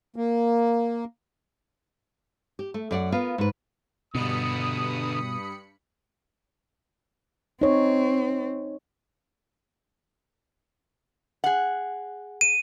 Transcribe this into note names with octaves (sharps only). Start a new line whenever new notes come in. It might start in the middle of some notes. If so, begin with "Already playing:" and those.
A#3
G4
A3
F#2 D5 F#5
B3 F4 A#4 F5
G#2 B4
G2 B2 D3 B3 B5 D#6 C#7
C4 D#4 C#5
G#4 F#5
D#7